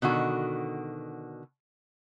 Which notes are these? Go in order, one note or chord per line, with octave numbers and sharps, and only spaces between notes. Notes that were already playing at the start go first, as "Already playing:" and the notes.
B2 D3 D#3 F#4